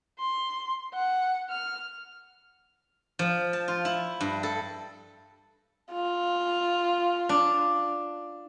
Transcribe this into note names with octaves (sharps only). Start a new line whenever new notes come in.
C6
F#5
F6
F3
A5
F4
E4
G2
A4
F4
D4